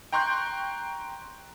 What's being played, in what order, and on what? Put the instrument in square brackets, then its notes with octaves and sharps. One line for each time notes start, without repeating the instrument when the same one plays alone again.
[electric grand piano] G5 A#5 C6 C#6 F#6 G6